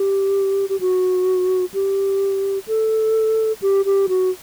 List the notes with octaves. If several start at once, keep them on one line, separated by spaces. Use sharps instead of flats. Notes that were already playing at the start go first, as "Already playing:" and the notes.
Already playing: G4
G4
F#4
G4
A4
G4
G4
F#4